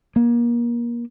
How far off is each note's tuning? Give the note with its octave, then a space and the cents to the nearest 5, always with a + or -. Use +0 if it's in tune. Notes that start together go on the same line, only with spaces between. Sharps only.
A#3 +30